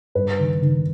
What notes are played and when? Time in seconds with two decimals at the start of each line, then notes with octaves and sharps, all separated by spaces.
0.15 G2 B4
0.39 D#3
0.62 D#3